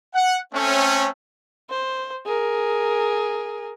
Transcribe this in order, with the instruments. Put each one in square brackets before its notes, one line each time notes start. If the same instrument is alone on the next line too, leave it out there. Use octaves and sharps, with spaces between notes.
[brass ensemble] F#5
A3 C4 C#4
[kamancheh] C5
G#4 A#4